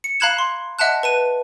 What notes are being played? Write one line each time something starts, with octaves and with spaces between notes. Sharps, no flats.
C#7
F5 A#5 B5 F#6 G#6 E7
C6
D#5 E5 F#5 A5 F#6
B4 A5 D#7